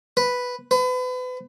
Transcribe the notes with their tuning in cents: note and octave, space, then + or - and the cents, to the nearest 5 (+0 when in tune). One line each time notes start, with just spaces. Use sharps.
B4 +0
B4 +35